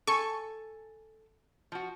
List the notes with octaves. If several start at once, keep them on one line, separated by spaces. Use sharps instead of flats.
A4 G#5 C#6
F3 F#4